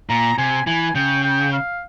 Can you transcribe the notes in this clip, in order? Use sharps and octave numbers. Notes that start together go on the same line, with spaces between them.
A#2 A#5
C3 G#5
E3 G#5
C#3 G5
G5
F5